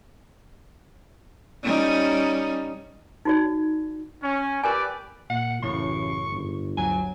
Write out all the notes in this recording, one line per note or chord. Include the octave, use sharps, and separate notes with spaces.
G3 C#4 D#4
D#4 F#4 D5
C#4
G4 A#4 B4 D5 G#5
A#2 F#5
A1 F#2 A2 C#3 C#6
G1
D2 F#3 G#5